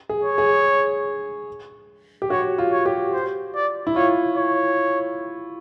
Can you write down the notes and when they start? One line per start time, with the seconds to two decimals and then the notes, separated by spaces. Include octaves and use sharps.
0.09 G#4
0.24 C#5
0.38 G#4
2.22 G4
2.30 F#4 C#5
2.58 F4
2.72 C#5
2.86 G4
3.13 C5
3.55 D5
3.87 E4
3.96 F4 C#5
4.37 C#5